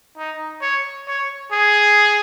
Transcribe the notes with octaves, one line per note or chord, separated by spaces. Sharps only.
D#4
C#5
C#5
G#4